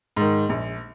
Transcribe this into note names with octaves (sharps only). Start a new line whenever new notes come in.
G#2 D#3
A#1